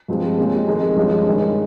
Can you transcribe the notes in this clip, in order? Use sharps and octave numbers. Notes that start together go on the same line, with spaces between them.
G2 F3 G#3 C4
A#2 G#3 C#4 G4
F2 D#3 G#3 D#4
G2 F3 G#3 C#4
G2 D#3 G#3 C#4